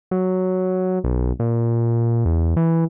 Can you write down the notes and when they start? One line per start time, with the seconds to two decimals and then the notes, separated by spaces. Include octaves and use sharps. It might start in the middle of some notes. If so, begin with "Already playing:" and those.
0.11 F#3
1.04 B1
1.40 A#2
2.25 E2
2.57 E3